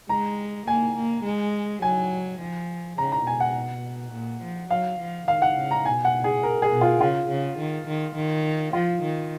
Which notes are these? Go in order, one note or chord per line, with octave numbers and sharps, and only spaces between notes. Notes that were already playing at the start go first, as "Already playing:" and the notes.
G#3 A#5
A#3 G#5
A#3
G#3
F#3 G#5
F3
C#3 A#5
A#5
B2 G#5
F#5
A#2
F3
F#3 F5
F3
D#3 F5
F#5
C#3
A#5
B2 G#5
F#5
G#4
A#4
G#4
B2
F4
C#3 F4
C#3
D#3
D#3
D#3
F3 F4
D#3